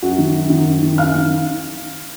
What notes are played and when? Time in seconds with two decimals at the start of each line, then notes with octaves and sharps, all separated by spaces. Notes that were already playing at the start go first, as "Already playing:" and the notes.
0.02 F#2 F#4 F#5
0.18 D#3
0.35 F#2
0.50 D#3
0.66 F#2
0.83 D#3
0.98 F#2 F5 F6
1.15 D#3